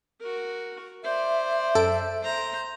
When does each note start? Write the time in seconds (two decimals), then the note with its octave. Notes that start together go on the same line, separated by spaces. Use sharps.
0.20 F#4 A#4
1.04 C5 D5 E5
1.75 F#2 A4 D7
2.22 C5 A#5